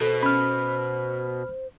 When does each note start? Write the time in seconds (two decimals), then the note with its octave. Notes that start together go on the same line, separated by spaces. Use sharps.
0.01 B2 A4 C5
0.23 C#4 B5 F6